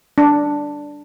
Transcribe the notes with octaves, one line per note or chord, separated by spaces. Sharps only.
D4